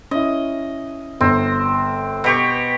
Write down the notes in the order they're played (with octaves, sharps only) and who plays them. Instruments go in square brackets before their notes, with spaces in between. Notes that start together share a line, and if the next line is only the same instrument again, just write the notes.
[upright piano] C#4 E4 [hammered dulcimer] D#5
[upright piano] G1 [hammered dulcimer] C4
[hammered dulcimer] B2 G4 C#6